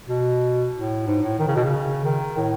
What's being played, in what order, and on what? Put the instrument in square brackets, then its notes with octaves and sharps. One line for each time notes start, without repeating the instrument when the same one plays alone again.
[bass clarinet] B2
A2
G#2
A2
D#3
C#3
B2
C#3
D#3
A2